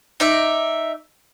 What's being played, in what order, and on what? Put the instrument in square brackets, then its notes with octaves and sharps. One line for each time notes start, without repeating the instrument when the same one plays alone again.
[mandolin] D#4 D5 E5